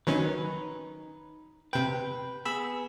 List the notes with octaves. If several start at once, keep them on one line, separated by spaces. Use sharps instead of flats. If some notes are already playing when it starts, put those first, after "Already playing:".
D#3 F#3 C#4 D#4 B4
C3 B4 G5
B3 G#4 B5 E6